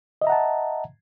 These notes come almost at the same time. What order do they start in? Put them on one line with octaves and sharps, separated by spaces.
D#5 E5 A#5 F#5 A5